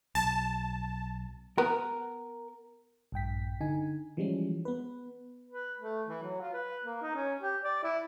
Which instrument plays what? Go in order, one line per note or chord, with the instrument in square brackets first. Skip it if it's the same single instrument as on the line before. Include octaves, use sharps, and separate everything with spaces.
[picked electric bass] B1 [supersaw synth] A5
[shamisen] B3 [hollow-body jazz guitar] A#4
[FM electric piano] A#1 G2 G5 B6
D3 D#4 G#5
E3 F3 G3 G#3 C#4
B3 B4
[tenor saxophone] B4
A3
E3
F#3
F4
B4
A#3
D#4
C#4
G4
D5
E4